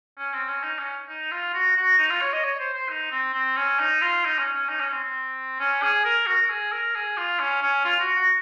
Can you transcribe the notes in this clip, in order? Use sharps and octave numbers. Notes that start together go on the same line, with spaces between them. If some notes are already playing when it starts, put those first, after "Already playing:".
C#4
C4
C#4
D#4
C#4
D#4
F4
F#4
F#4
D#4
F4
C#5
D#5
C#5
C5
C5
D#4
C4
C4
C#4
D#4
F4
D#4
C#4
C#4
D#4
C#4
C4
C4
C#4
G#4
A#4
F#4
A#4
G#4
A#4
G#4
F4
C#4
C#4
F4
F#4
F#4